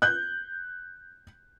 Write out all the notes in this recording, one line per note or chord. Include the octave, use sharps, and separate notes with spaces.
F#6 G6